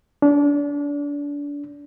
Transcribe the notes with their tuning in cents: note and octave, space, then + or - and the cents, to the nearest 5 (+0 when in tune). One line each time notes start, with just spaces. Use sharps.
D4 -30